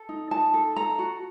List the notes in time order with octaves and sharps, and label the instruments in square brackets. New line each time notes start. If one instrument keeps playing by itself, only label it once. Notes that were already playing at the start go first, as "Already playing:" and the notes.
Already playing: [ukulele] A4
D#4
D#4 A5
A4
A4 A#5
F#4